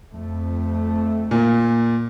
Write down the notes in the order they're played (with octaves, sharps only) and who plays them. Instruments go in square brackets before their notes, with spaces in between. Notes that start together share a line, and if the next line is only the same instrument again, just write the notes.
[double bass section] F2 A3
[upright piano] A#2